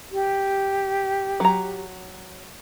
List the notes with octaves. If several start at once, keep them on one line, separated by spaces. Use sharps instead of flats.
G4
F#3 A#5